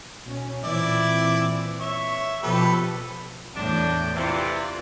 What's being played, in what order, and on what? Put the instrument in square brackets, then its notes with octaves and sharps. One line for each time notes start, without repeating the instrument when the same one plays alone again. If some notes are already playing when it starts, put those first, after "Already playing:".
[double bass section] B2 C#4
[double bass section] A#2 E3 C4 [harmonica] E4 D5
[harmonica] C#5 E5
[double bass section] B2 F3 [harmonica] G4 A4 B4
[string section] E2 A2 G6 [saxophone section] D4
[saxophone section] C3 E3 [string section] F4 D5